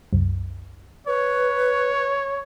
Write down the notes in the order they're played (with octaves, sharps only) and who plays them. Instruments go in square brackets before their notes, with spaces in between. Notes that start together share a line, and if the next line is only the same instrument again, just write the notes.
[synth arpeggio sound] C2 F#2
[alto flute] B4 [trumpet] C#5